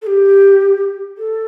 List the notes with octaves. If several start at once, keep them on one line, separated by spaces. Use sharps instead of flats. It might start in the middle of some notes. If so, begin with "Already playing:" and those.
A4
G4
A4